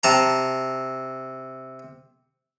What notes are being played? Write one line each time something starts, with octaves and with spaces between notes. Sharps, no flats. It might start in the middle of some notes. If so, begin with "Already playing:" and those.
C3 A5 A#5